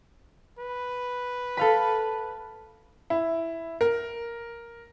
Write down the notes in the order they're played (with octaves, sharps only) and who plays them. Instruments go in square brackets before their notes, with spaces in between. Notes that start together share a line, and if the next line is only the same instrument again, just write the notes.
[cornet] B4
[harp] A4 F5 B5
[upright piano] E4
A#4